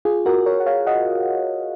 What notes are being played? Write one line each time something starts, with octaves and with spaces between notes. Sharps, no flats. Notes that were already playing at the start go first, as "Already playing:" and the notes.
F4 G#4
F#4 A#4
A#4 C#5
F#5
C#5 F5
D#5 F#5